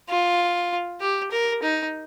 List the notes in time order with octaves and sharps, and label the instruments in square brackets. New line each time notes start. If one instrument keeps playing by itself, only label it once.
[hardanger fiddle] F4
G4
A#4
D#4